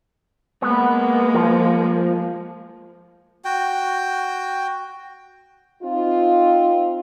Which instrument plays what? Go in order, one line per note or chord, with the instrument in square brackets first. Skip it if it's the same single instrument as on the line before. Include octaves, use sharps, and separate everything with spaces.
[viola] G#3 A#3 [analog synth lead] B3
[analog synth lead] F3
[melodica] F#4 G5
[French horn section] C4 D#4 F4